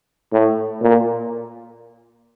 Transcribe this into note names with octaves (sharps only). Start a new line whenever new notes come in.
A2
A#2